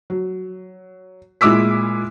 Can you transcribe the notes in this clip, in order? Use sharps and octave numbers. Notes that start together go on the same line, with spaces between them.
F#3
A#2 G#3 E4 D6 E6 B6